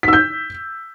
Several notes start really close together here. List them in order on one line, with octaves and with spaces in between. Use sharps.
B6 E6 G6